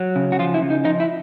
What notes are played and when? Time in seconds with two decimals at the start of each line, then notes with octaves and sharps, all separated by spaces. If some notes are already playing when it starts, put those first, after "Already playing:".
Already playing: F#3
0.16 C#3
0.32 F#4
0.39 F3 F4
0.54 E4
0.62 C#3
0.70 D#4
0.85 F3 D#4
1.00 E4